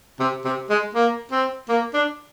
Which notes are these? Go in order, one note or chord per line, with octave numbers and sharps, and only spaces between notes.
C3
C3
G#3
A#3
C4
A#3
D4